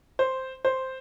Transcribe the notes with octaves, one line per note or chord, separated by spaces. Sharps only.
C5
C5